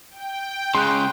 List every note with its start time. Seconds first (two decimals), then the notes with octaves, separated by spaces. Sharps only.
0.10 G5
0.75 C#3 G#3 C6 F#6